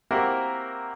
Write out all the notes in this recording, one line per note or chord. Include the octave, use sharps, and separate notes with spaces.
A#3 C4 E4 F#4 G4 A#4